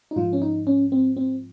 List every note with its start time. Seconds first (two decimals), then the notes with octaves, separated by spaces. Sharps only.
0.11 D#4
0.16 G#2 F3 F4
0.33 C#4
0.42 D#4
0.67 C#4
0.92 C4
1.17 C4